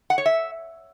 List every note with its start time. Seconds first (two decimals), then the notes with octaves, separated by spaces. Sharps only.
0.10 F#5
0.18 C#5
0.26 E5